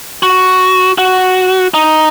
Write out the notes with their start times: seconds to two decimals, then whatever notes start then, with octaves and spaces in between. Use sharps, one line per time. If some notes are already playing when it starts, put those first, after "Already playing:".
0.23 F#4
0.98 F#4
1.74 D#4